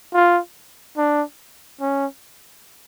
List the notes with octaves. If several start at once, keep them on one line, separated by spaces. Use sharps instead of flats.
F4
D4
C#4